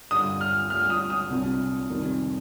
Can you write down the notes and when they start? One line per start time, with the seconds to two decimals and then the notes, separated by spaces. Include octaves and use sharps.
0.11 G2 D3 G3 D#6
0.41 F6
0.70 D2 D3 G3 F6
0.90 D#6
1.10 D#6
1.30 C2 C3 G3 D4
1.90 F2 C3 D#3 G3